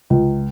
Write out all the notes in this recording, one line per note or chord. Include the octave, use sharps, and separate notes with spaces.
C#2